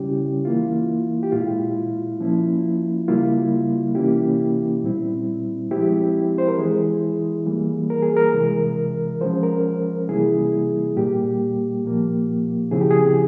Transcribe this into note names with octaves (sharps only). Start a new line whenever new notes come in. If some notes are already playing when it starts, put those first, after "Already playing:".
Already playing: C#3 G3 C#4 E4 G4
E3 A#3 E4 F4
G4
A#2 G#3 E4 F4
F3 A#3 C#4 E4
C#3 G3 A#3 E4 F4
C3 E3 A#3 C#4 E4 G4
A#2 G3 C4 E4
F3 G#3 C4 E4 G4
C5
A#4
E3 G#3 E4 G#4
E3 G3 A#3
A#4
G#4
A#4
C3 E3 G#3
F3 G#3 C#4 C5
A#4
C3 E3 G3 A#3 E4 G#4
A#2 G3 A#3 G4
A#2 F3 A#3
C#3 F3 C4 E4 G#4
G4
G#4